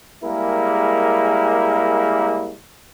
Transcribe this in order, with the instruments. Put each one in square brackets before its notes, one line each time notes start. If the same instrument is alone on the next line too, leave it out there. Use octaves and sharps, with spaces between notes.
[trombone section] G3 G#3 A#3 E4 G#4 A#4